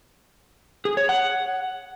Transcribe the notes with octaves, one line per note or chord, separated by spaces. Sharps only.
G#4
C#5
F#5